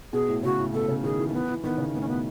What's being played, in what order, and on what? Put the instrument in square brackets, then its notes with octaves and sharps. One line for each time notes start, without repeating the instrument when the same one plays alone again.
[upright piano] B2 [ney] G#4
[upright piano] A2
[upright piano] C#3 [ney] F#4
[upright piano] A2
[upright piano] B2 [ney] A4
[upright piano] C#3
[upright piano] D#3 [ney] G#4
[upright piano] E3
[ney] A3
[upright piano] E3 [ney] B3
[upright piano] E3
[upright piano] D#3 [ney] B3
[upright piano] C#3
[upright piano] A2 [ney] B3
[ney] C#4
[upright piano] B2 [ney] B3